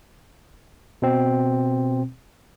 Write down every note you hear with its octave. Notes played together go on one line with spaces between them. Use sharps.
B2 C4